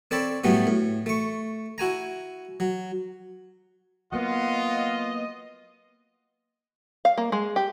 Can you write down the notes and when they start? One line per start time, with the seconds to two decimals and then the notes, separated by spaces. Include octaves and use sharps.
0.11 C4 A4 C#5 D5 A5 B5
0.44 A2 F#3 G3 A3 B3
0.67 A2
1.06 A3 C#6
1.78 E4 F#4 G#5 A#5
2.60 F#3
4.12 F#3 A#3 B3 F4 D#5 F#5
7.05 F5
7.18 A#3
7.32 G#3
7.56 G4